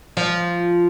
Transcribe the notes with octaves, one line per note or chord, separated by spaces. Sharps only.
F3